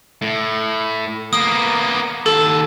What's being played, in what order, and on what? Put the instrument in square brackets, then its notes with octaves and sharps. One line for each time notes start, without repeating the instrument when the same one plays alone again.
[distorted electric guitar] A2
[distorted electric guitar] A#3 B3 [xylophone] D#6
[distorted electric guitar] D#2 A5 [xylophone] A4